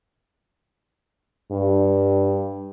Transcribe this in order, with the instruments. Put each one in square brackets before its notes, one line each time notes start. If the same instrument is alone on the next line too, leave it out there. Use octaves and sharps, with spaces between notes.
[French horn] G2